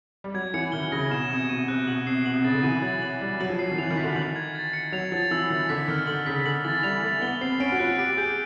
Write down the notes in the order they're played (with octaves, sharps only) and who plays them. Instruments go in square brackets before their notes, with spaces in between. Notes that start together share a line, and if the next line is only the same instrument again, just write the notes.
[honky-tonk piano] G3
[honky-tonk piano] F#3 [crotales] G#6
[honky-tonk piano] E3 [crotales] C#7
[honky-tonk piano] D#3 [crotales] G7
[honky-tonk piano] C#3 [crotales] A#6
[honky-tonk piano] B2 [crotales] E7
[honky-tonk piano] C3 [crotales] G#6
[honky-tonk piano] B2 [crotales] D#7
[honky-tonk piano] C3 [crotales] F#6
[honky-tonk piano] B2 [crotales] F#7
[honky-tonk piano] C3 [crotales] C7
[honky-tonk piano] B2 [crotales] F#7
[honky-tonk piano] C3
[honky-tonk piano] C#3 [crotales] A6
[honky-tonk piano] D3
[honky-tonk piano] E3 [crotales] D#7
[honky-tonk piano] F#3 [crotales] A6
[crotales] F#7
[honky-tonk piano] G3 [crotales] A6
[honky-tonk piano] F#3 [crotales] F#7
[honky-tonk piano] F3
[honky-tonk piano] F#3 [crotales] C7
[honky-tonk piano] D#3
[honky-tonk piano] E3 [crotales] F7
[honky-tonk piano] D#3
[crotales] B6
[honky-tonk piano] D3
[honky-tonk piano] D#3 [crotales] F#7
[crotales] G#6
A6
C#7
[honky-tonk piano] F#3 [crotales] F7
[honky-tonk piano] F3 [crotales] A6
[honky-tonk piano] E3 [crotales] E6
[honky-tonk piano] D#3 [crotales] A6
[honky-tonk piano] D3 [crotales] B6
[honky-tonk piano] D#3 [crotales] F6
[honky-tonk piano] D3 [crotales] F#7
[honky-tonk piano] C#3 [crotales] B6
[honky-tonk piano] D3 [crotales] F#7
[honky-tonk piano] E3 [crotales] A6
[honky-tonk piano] G3 [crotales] F7
[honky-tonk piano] A3 [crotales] A6
[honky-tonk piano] B3 [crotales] G7
[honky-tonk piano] C4 [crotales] C7
[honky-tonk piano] C#4 [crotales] D7
[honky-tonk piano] F#4
[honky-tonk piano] F4 [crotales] F#6
[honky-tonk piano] G4 [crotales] D7
[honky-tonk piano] G4
[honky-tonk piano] G#4 [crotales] G6